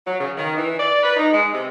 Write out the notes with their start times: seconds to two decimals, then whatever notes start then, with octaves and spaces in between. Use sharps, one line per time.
0.07 F#3
0.19 C#3
0.38 D#3
0.56 E3
0.80 D5
1.02 B4
1.17 D#4
1.32 G#3
1.53 C3